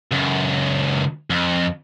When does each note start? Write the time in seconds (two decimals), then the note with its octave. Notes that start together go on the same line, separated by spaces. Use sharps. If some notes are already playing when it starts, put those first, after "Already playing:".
0.11 C#2 F#2
1.30 F2